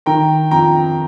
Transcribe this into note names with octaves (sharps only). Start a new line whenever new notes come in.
D#3 G5 A#5
F2 G5 A#5